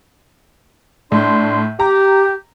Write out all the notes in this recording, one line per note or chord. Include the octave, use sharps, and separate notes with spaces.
A2 D4 C6
G4 A#5